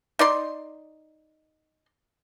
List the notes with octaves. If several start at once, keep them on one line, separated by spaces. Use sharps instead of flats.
D#4 D5 C6